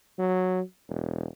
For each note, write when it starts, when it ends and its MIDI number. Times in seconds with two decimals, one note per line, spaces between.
0.19 0.61 54
0.89 1.26 28